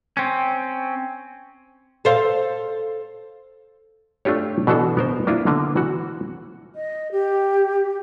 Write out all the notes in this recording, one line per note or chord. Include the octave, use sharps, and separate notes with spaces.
C4 C#4
A4 C5 F5
A3 D4 F4 G4 C#5
B2 E3 B3 D4 F#4 A4
B3 A#4 C5
A#3 D4 E4 F4
D3 A#3 B3
E3 F#4
D#5
G4